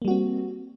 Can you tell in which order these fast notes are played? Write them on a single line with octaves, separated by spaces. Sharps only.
A#3 G3 F#4 C4